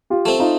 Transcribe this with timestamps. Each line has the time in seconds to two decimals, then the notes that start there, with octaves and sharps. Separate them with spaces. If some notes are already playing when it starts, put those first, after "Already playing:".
0.10 F4 G4
0.25 A3 C4
0.39 D#4 F4